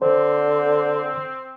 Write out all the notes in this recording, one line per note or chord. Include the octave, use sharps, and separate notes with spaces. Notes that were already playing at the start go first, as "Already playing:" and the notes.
D3 C4 C5